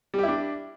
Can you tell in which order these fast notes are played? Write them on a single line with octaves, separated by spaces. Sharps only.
G3 G4 E4 D4